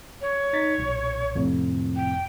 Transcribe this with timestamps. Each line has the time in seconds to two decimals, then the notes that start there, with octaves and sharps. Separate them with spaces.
0.21 C#5
0.53 D#4 A6 B6
0.78 B1 A#2
1.36 F2 A2 C3
1.96 G5